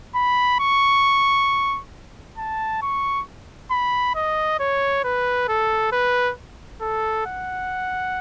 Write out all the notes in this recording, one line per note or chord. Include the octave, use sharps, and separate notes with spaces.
B5
C#6
A5
C#6
B5
D#5
C#5
B4
A4
B4
A4
F#5